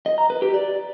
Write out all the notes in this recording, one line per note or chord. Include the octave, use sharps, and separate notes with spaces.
D#5
A#5
B4
G4
D5